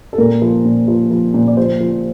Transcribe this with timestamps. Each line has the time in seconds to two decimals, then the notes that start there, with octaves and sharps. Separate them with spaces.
0.13 A4
0.18 A#2 A#4
0.42 F3
0.65 A#2
0.88 F3
1.11 F3
1.34 A#2
1.48 D5
1.57 F3 C5
1.81 F3